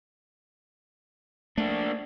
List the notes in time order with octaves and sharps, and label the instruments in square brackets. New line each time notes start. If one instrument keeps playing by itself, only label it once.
[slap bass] A3 [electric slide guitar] A#3 D4